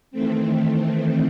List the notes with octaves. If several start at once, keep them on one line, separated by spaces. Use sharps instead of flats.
D#3 E3 A3 C4